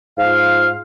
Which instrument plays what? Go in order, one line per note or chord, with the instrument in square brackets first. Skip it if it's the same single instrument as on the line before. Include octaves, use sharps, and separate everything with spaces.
[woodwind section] G#2 F4 F5